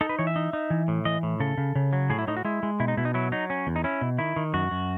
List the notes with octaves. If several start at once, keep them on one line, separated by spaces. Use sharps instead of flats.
D#4 A4
B4
E3 C#5
E5
D#4
D#4
E3
A2
E3 D#5
A2
C#3 A4
C#3
C#3
F#3
A2 G#4
E4
A2 D#4
F#4
G#3 E4
G#3
B2 E4
D#4
B2 E4
D#4
F#3 E4
F#3 D#4
C#4
E2
D#4
C#4 E4
B2
D#3 E4
D#3
F#2 F#4
F#2